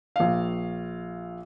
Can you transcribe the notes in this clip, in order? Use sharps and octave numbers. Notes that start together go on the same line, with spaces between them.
A#1 F5